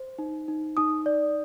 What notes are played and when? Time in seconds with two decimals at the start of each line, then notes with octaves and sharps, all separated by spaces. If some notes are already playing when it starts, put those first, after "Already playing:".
Already playing: C5
0.19 D#4
0.48 D#4
0.77 D#4 D#6
1.06 D5